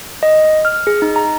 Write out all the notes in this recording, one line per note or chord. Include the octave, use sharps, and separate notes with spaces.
D#5
F6
G#4
D#4
A#5